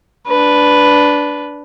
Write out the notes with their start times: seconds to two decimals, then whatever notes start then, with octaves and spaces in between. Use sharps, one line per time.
0.27 D4 B4